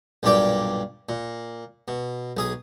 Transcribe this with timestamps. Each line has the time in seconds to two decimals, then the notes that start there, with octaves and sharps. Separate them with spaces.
0.23 B1 G2 A#2 G4 D5 G5
1.09 A#2
1.88 B2
2.37 B1 G#4 D#6